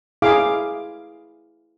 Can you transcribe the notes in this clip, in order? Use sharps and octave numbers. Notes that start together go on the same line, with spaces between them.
E4 G#4 F5 D6